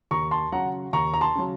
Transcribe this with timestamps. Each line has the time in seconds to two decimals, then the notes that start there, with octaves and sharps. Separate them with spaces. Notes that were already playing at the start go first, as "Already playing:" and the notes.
0.11 D#2 A#5 C#6
0.31 A5 C6
0.52 C#3 F#3 F#5 A#5
0.93 D#2 A#5 C#6
1.14 A#5
1.21 A5 C6
1.35 C#3 F#3